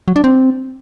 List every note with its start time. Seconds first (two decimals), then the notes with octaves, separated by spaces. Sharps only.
0.08 F#3
0.16 D4
0.24 C4